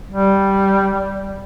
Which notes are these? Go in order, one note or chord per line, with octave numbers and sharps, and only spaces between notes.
G3